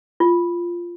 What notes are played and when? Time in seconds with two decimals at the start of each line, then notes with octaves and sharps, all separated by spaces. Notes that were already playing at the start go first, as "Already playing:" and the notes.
0.20 F4